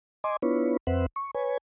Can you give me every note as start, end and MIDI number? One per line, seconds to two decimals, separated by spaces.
0.24 0.37 75
0.24 0.37 80
0.24 0.37 84
0.24 0.37 86
0.42 0.77 59
0.42 0.77 62
0.42 0.77 64
0.42 0.77 65
0.42 0.77 71
0.42 0.77 73
0.87 1.06 41
0.87 1.06 60
0.87 1.06 71
0.87 1.06 72
0.87 1.06 76
0.87 1.06 78
1.16 1.31 85
1.35 1.57 71
1.35 1.57 73
1.35 1.57 80